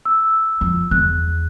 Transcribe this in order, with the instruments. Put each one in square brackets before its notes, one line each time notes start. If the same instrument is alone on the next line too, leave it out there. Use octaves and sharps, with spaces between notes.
[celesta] E6
[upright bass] F2
[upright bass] E2 [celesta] F#6